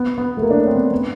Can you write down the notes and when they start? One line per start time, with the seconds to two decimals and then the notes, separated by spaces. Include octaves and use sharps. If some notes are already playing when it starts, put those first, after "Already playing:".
Already playing: B3
0.18 B3
0.37 A3
0.42 A#3
0.51 D4
0.59 C#4
0.67 C4
0.75 B3
0.91 B3